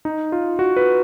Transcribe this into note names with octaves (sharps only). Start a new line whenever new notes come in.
D#4
F4
F#4
B4